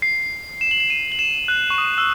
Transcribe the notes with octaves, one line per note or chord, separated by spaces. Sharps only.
C7
E7
F#7
E7
D#7
F#7
E7
F#6
C#6
D#6
E6